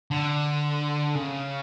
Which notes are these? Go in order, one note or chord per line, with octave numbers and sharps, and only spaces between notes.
D3
C#3